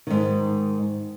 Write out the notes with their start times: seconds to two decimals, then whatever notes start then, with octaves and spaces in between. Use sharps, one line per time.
0.07 G#2 D#3